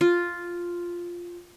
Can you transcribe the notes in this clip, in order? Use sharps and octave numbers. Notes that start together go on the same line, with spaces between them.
F4